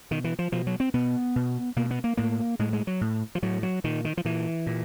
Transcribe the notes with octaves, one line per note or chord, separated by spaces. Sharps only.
B2 D#3
E3
F3
B2 F3
F#3
C4
B2 B3
B2
B2 A#3
B3
A#3
A2 A#3
A2 G#3
G#3
F#3
A2
F3
A2 F#3
F#3
A#2 D#3
D#3
F3
A#2 E3
A#2